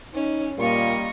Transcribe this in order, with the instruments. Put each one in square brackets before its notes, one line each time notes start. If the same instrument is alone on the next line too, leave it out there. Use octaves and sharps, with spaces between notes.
[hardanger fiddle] C#4 [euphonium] D#4
[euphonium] A#2 [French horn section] G3 A#3 [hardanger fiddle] F4 D#5 [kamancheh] C#6